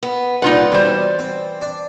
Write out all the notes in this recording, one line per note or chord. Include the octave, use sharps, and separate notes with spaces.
B3
C2 A#2 D#4 F4 B4 D5 F#5
B2 E3 G3 C5
C4
D4